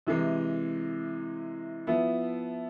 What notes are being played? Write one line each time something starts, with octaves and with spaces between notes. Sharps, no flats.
C3 E3 G#3
F3 B3 E4